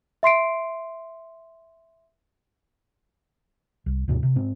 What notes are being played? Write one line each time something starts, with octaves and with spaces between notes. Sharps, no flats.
E5 C6 C7 D7
C2
D2 G2 B2 D#3
C3
G#2 C4